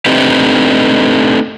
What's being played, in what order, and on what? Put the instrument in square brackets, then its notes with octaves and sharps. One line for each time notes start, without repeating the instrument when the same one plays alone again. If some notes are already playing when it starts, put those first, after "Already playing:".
[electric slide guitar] A3 C4 D4 D#4 G4 B4